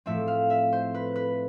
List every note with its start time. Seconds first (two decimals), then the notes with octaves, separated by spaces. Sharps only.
0.06 A2 F3 A3 C4 E5
0.28 F5
0.50 E5
0.72 C5
0.94 B4
1.15 B4